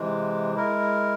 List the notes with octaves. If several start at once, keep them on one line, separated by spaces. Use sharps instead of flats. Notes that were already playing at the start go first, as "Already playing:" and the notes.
Already playing: C3 E3 G#3
G#3 E4 A#4